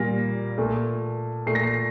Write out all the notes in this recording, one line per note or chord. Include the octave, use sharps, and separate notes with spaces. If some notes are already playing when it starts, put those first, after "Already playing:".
Already playing: A#2 G3 A#3 A#6
A#2 A3
A#2 A3 C7
A#6
C7